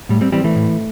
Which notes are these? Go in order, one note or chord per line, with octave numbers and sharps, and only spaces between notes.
A2 G3
G3 C4
E3 G3 C4
E3 A3
A2